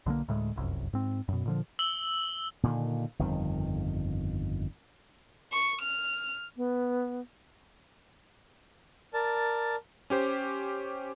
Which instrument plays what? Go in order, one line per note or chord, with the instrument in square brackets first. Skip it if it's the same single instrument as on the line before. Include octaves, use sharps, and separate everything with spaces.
[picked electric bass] B1 D3 D#3 A#3
D2 A2 G#3
F1 C2 F#2
G#2 C4
F#2 B2
A#2 D3 F3
[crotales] E6 F#7 G7
[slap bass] A#2 D3 D#3
G1 F2 D#3
[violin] C#6
F6
[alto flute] B3
[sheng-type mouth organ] A#4 D5 A5
[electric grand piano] C#4 G4 C5